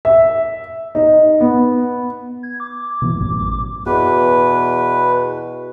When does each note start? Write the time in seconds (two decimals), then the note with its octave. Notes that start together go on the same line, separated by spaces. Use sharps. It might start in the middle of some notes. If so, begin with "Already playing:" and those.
0.05 E5
0.95 D#4
1.40 B3
2.43 G#6
2.60 D6
3.02 B2 E3 B3
3.16 A1 F#2 A#2
3.86 E2 B2 B4